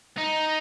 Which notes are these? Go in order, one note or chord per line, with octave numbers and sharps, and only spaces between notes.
D#4